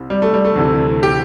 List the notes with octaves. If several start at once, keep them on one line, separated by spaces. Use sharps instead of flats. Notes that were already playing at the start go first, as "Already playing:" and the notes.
Already playing: C2 C3
G3
A3
G3
A3
D2 C3 E3
G4